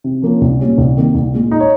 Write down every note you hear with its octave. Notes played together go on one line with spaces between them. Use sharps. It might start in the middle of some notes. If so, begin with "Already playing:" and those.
C3
F3 A#3 C#4
C2
A#2 G3 C#4
C2
C3 D#3 A#3
C2
A#2 G#3
D#4
C#5